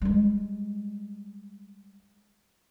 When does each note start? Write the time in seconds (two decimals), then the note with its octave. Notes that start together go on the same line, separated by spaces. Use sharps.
0.02 G3 G#3